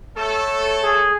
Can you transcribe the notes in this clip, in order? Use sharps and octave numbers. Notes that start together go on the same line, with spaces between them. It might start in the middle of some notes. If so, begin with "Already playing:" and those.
A3 A4 C#5
G#4